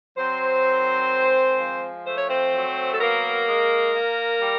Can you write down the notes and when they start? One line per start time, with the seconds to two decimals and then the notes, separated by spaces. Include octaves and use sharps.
0.17 F#3 C4 C5
0.65 D#3
1.12 G#3
1.59 F3
2.05 A3 C5
2.17 C#5
2.30 C4 C5
2.54 F#3
2.94 A4
3.00 A#3 B3 A#4
3.47 G#3
3.94 A#3
4.41 G3